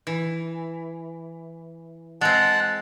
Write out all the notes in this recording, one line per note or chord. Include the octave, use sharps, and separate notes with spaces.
E3
G#3 C4 F#5 A5